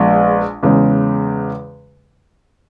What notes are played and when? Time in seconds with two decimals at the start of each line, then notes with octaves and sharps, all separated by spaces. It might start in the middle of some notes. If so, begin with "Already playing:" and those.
Already playing: A#1 G#3 B3
0.63 E2 C#3 G#3